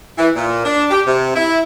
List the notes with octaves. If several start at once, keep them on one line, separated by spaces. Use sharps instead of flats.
E3
A#2
D4
G4
C3
E4